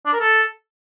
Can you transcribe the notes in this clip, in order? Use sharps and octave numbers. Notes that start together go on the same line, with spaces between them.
D4
A#4
A4